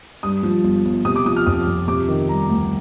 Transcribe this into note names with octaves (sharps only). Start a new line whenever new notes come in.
G2 D#6
F3
G1
G1
C3 D#6
D6
F3 D#6
F6
F2 D#6
F2
C3 D6
D#3
G3 A#5
D2